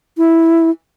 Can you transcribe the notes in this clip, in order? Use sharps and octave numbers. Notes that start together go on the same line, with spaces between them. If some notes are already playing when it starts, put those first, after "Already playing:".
E4